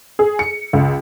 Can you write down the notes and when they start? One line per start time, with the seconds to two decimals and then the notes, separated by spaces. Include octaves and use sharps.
0.19 G#4
0.39 C#7
0.73 C#2